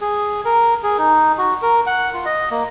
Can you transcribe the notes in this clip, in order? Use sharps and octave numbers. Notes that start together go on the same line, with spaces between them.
G#4
A#4
G#4
D#4
F#4
A#4
F#5
F4
D#5
A#3